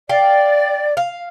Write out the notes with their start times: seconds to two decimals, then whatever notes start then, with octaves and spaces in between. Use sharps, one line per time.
0.09 D5 F5 G5
0.97 F5